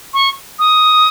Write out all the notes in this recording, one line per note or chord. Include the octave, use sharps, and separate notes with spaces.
C#6
D#6